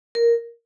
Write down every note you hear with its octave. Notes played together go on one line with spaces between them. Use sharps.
A#4